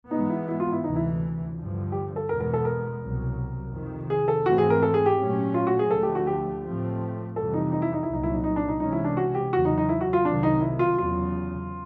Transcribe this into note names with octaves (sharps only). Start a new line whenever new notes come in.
G#2 E3 G#3 B3 D#4
E4
E4
F4
E4
D2 C3 E3 D#4
E4
G2 D3 F3
G4
A4
E2 B2 G#3 B3 A#4
A#4
A4
A#4
C2 B2 F#3
F2 C3 D#3
G#4
A4
G#2 E3 A3 C4 F#4
G#4
A#4
A4
G#4
G4
A#2 F#3 A3 C#4
F4
F#4
G#4
D2 D3 F3 A3 A4
G4
F#4
G4
A2 F3 A3 C4
F2 C3 E3 G3 A4
D#4
D#4
E4
D#4
E4
C2 A#2 F#3 D#4
E4
D#4
D#4
D4
D#4
C3 E3 G#3 C#4 D#4
E4
D4
F#4
G4
E2 C#3 F#3 F#4
D#4
D#4
E4
F#4
F4
C2 C3 D#3 F#3 D4
D#4
E4
F4
E2 C#3 F#3 F4